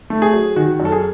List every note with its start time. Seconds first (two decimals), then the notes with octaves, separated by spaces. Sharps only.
0.10 A3
0.22 G#4
0.33 F#3
0.56 D#3 F#4
0.80 F#2
0.85 A4
0.92 G#4